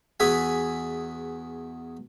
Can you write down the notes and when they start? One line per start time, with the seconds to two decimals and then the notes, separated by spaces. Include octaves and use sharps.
0.20 E2 F#4 G#4 E5 G#5